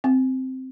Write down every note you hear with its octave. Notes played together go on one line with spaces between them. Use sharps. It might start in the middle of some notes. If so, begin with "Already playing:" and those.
C4